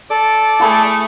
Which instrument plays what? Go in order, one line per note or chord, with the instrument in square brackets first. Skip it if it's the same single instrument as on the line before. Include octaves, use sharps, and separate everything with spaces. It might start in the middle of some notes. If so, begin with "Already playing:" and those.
[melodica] A4 D5 D6
[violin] A3 [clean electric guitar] E4 G#4